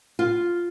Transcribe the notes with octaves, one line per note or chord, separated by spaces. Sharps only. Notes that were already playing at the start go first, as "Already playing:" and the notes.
F4